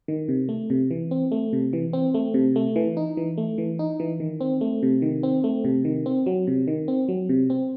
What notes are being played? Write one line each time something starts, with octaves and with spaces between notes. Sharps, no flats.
D#3
C3
A3
C3
E3
C4
A3
C3
E3
C4
A3
C3
A3
E3
D#4
E3
A3
E3
D#4
E3
D#3
C4
A3
C3
D#3
C4
A3
C3
D#3
C4
F#3
C3
D#3
C4
F#3
C3
C4